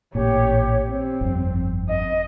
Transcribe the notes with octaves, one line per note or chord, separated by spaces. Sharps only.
A1 A#2 G4 C#5
C4
G1 F2
D#5